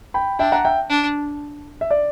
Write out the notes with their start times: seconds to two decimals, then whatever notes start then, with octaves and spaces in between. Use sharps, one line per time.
0.14 G5 B5
0.39 D4 E5 G5
0.52 F#5 A#5
0.65 E5 G5
0.90 D4
1.81 E5
1.91 D5